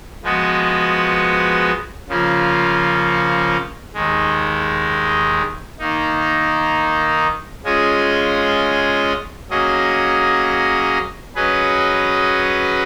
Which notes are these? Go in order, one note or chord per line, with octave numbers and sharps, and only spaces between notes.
F3 G#3 B3 F#4
C#3 F3 A#3 C#4 F4
D#2 D#3 G#3
D#3 A#3 D#4
G#3 C#4 F4 G#4 D#5
F#3 A#3 C#4 G#4 D#5
F#3 C#4 G#4 B4 D#5